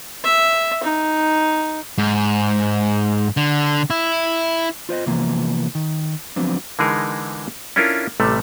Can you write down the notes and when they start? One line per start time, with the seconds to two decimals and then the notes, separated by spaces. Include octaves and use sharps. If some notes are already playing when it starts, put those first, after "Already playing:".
0.24 E5
0.83 D#4
1.98 G#2
3.37 D3
3.90 E4
4.89 F4 C5 D5 D#5
5.06 C3 E3 F3 A#3 B3
5.75 D#3
6.36 F3 F#3 B3 C4 D4
6.79 D3 E3 G#3 D#4 G#4 A#4
7.76 C#4 D4 E4 F4 A4 A#4
8.20 A1 C3 G3 A3